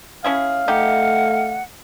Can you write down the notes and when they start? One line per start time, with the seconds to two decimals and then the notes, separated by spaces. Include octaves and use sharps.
0.24 C#4 E4 G#4 F5
0.68 A3 D#4 G4 F#5